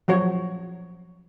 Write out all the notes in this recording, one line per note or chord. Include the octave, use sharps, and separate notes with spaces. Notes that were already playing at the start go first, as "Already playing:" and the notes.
F3 F#3 F#4 C#5